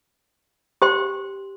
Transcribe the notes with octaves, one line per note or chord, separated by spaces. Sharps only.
G4 C5 G5 C6